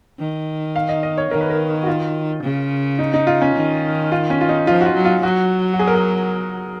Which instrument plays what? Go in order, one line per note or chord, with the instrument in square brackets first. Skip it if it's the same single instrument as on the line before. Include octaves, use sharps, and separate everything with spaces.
[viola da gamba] D#3
[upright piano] F5
D#5
D#5
C#5
[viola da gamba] D#3 [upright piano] A#4
[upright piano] B4
A#4
F#4
F4
[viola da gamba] C#3
[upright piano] D#4
D#4
F4
C#4
[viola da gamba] D#3
[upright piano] F4
C#4
F4
D#4
[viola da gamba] F3 [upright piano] F4
[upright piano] F#4
F4
[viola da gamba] F#3
[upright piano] F4
[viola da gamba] F#3 [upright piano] F#4
[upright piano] F#4
G#4
A#4
G#4